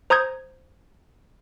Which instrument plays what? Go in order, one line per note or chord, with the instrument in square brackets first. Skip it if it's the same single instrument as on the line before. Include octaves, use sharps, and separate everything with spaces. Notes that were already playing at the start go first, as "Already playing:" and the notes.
[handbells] C5 A#5 D#6 G6 G#6